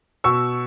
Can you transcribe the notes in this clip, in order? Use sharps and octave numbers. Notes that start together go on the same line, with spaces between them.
B2 C#6 E6